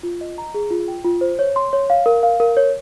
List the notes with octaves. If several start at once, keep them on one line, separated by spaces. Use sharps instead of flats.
F4
D#5
A#5
G#4
F4
G5
F4
C5
C#5
C6
C#5
F5
A#4
F5
A#4
C#5